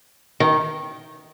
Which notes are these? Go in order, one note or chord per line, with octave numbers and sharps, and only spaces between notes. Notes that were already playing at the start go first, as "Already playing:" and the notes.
D#3